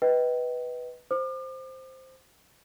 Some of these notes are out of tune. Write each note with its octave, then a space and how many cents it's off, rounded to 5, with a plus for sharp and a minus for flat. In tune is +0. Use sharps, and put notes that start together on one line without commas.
B4 +0 D#5 +20 G5 -20
C5 +0 D6 +40